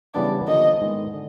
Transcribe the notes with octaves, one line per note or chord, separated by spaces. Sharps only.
C#3 E3 G3 B3 D4 D5
D3 F3 A#3 D#5
G#2 D#3 G#3 B3
D3